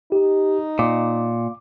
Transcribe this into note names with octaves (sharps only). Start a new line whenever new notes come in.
D#4 G4
A#2 D6